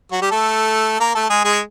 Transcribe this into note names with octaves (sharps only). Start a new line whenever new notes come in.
F#3 F#4
G3 G4
A3 A4
A#3 A#4
A3 A4
G#3 G#4
G#3 G#4